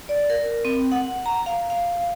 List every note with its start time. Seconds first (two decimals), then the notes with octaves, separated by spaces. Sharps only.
0.09 D5
0.30 A#4
0.65 C4
0.92 F#5
1.26 A#5
1.46 F5
1.70 F5